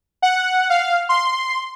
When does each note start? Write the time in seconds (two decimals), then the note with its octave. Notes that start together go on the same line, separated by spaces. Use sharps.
0.22 F#5
0.70 F5
1.09 C6